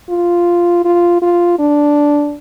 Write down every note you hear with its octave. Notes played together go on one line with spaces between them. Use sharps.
F4
F4
F4
D4